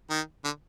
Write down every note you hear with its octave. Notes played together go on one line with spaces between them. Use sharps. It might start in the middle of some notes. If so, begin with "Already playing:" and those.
D#3
D3